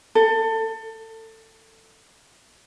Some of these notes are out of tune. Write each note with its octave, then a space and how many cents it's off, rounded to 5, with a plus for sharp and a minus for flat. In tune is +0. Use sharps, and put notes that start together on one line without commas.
A4 +25